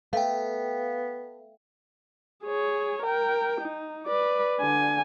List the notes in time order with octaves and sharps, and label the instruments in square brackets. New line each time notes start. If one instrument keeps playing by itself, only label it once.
[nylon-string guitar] A3 [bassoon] B3 [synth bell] F5 G5
[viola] G#4 C#5
A#4 G5
D#4
B4 D5
D3 G#5